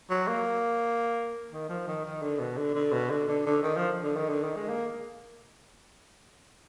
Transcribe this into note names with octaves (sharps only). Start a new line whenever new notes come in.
F#3
A#3
D#3
F3
D#3
D#3
D3
B2
D3
D3
B2
D3
D3
D3
D#3
F3
D3
D#3
D3
D#3
G#3
A#3